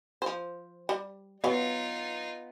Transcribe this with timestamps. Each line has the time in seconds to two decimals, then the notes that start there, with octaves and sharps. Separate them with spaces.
0.22 F3 C5
0.89 G3
1.44 F#3 B3 D#4 F4 F5